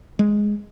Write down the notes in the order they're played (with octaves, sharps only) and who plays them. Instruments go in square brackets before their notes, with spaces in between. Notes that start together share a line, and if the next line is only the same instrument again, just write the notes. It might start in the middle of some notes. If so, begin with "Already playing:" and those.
[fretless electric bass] G#3